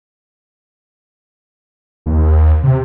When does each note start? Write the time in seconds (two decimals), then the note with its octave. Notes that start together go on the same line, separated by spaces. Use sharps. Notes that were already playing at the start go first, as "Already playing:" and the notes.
2.06 D#2
2.63 C3